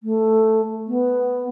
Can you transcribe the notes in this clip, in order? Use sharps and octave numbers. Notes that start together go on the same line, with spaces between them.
A3
B3